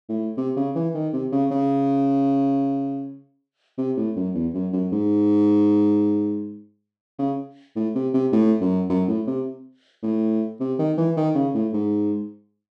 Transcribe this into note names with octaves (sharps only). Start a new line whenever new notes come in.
A2
C3
C#3
E3
D#3
C3
C#3
C#3
C3
A2
F#2
E2
F#2
F#2
G#2
C#3
A2
C3
C3
A2
F#2
F#2
A2
C3
A2
C3
D#3
E3
D#3
C#3
A2
G#2